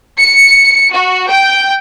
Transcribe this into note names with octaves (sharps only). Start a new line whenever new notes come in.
C#7
F#4
G5